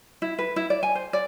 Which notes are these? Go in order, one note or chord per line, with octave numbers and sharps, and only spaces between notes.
E4
B4
E4
D5
G#5
C5
D5